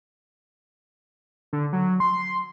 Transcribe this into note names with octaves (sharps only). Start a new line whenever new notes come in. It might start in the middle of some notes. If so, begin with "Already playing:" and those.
D3
F#3
C6